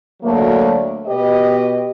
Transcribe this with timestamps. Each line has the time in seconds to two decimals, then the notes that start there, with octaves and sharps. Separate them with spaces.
0.23 D2 F#3 A3 A#3
1.07 B2 G4 B4 D#5